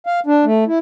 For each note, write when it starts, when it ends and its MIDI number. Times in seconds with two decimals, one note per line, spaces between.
0.06 0.20 77
0.26 0.45 62
0.45 0.64 57
0.67 0.79 64